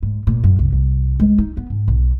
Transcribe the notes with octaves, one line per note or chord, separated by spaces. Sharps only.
G#2
A#2
F#2
C2
C2
G#3
D#4
B3
G#2
B1